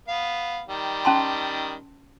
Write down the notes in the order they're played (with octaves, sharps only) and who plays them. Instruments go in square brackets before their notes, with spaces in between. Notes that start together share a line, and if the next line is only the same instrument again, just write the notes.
[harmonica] B3 F5
D#3 G3
[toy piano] C#4 A5 C6